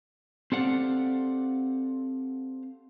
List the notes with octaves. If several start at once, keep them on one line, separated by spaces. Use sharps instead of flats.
C4 G4 A4 D5 F5 F#5